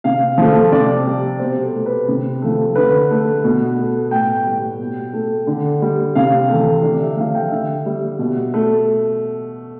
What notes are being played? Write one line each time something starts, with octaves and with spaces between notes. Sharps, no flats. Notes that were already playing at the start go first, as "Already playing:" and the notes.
C3 F5
F3 A3
C3 D5
G3
B2 C5
A4
A3
B4
C3
F3 A3
D3 B4
A3
B2
A3
A2 G5
G3
B2
A3
D3
G3
C3 F5
E3 A3
D3 D5
E5
F3 A3 F5
G5
D3 E5
G3
B2
A3